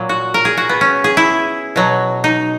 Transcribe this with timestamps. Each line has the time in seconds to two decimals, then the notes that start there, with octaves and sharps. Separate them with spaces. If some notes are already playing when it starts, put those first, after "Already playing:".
Already playing: A#2 F#3
0.09 F#4
0.34 A#4
0.45 G#4
0.57 F#4
0.69 B3
0.81 C#4
1.04 G#4
1.17 E4
1.76 B2 F#3
2.24 D#4